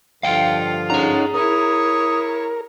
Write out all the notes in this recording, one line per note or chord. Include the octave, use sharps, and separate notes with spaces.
G2 D3 F3 F4 F5 G5
C#4 D#4 G#4 F#5 A#5
E4 A#4 C#5 D#6